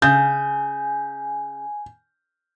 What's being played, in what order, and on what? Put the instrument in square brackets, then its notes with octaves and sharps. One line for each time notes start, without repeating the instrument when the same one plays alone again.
[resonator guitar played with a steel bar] C#3 [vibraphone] G#5 [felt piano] G6